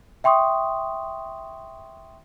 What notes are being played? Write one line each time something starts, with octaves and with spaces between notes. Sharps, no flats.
E5 G5 C6 C#6 D#6